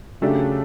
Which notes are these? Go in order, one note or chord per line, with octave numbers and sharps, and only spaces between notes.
C#3 F#3 A3 D4 G4